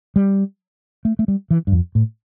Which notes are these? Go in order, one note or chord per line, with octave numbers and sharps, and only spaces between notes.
G3
A3
A3
G3
E3
G2
F2
A2